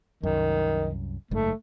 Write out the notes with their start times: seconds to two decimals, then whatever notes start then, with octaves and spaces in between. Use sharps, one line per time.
0.23 C2 F#2 D#3
1.31 F#1 G#2 A3